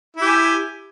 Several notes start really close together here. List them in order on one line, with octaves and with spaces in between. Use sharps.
E4 G4 G#5